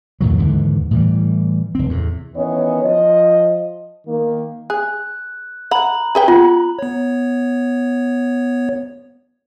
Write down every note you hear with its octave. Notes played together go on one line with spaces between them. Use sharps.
F2 A2 D#3 F#3
D#2 G#2 D3 E3
A2 E3 G3
F1 C4
E2 A2
D#3 E3 B3 C#4 C#5 D#5
F3 D#5
D#3 A#3
G#4 F#6
F#5 A#5 B5 F#7
G#4 B4 G5
B3 F4
B3 C#5